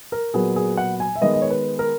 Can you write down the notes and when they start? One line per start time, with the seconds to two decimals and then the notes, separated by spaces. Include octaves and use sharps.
0.12 A#4
0.34 A#2 F#3 B3 G#4
0.56 G#4
0.77 F#5
1.00 G#5
1.16 E5
1.21 D#3 G#3 B3 D#5
1.34 D#5
1.42 C#5
1.50 B4
1.79 A#4